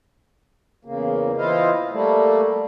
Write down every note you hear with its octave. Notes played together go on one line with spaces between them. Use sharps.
E2 C#3 A#3
E3 E4 F4 C5 D#5 F5
G3 A3 A#3